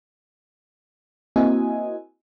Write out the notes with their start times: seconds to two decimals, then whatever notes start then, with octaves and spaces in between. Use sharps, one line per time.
1.36 A#3 C4 E4 F#4 D#5 G#5